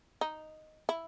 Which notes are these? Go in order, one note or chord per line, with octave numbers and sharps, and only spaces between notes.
D#4
E4